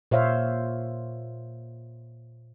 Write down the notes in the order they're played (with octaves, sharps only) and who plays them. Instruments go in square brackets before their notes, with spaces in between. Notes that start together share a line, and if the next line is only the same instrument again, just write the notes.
[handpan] A#2 C5 C#5 E5 F5